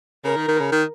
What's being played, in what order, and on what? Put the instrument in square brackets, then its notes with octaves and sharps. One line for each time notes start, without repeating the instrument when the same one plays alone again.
[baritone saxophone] C#3 [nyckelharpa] A#4
[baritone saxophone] D#3
D#3
C#3
D#3